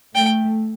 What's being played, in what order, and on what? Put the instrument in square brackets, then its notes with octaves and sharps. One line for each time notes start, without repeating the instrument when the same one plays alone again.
[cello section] A3 [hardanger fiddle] G5